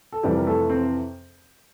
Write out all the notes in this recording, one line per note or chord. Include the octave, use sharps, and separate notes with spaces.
A4
F2 C3 E3 G3 G4
A#4
A3 A4
C4 C5